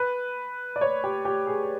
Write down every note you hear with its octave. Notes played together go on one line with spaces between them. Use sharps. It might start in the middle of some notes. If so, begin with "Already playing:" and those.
Already playing: B4
D5
C#5
G4
G4
G#4